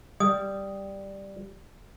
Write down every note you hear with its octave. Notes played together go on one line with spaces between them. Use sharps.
G3 D#6